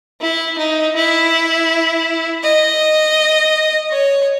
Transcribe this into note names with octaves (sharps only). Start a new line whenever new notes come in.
E4
D#4
E4
D#5
C#5